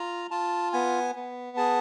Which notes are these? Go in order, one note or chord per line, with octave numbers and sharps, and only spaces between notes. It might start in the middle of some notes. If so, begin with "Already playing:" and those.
Already playing: F4 A#5
F4 A5
B3 G#5
B3
G#4 A5